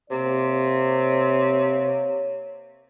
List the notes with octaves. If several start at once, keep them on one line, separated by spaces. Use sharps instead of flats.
C3 A#3 C#5